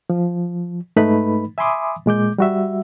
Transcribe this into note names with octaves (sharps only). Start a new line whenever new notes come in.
F3
G#2 A3 D#4 B4 B5
E5 G#5 B5 C6 D6 D#6
A#2 G#3 D6 G6
G3 F#4 E5